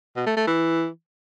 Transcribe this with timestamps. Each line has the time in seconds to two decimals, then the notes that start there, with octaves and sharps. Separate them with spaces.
0.16 B2
0.26 A3
0.37 A3
0.47 E3